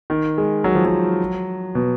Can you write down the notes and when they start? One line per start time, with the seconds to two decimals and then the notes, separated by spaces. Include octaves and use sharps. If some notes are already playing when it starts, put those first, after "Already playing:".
0.10 D#3
0.38 G#3
0.64 F#3
0.75 F3
0.85 F#3
1.75 B2